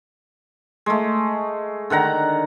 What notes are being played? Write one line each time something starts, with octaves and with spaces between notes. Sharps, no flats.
G#3 A3
D3 D#3 F#5 A#5